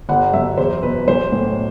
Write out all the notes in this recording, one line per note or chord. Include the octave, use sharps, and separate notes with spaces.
G1 F#5
F#2 E5
E2 C5
B2 B4
B1 C5
A2